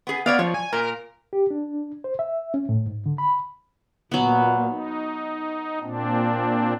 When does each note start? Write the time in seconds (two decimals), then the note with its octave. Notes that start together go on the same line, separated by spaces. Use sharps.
0.07 B3 G#4
0.26 B3 C#5 D5 F5
0.39 F3 C#5
0.54 G#5
0.73 A#2 A#4
1.33 G4
1.50 D4
2.04 C5
2.19 E5
2.54 C#4
2.69 A2
2.86 G#2
3.06 D3
3.18 B5
4.12 A#2 F#3 B3
4.68 D#4
5.81 A#2 C4 D4